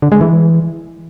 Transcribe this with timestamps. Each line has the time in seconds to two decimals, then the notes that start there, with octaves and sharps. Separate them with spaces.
0.02 D3
0.12 G#3
0.21 E3